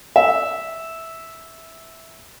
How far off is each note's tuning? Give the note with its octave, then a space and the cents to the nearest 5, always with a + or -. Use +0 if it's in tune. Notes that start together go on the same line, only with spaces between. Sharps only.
E5 -10